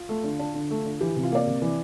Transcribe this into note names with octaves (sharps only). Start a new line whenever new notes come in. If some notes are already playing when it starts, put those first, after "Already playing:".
Already playing: F4
A3
D3
D4
D3
A3
D3
E3 G4
C3
F4
A#3 D5
C3
E3